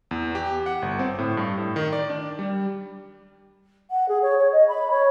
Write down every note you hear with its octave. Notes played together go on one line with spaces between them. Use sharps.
E2
G4
F#5
G1
C4
A2
G2
A2
D#3
D5
D4
G3
F#5
G#4
C#5
C#5
D#5
B5
C#5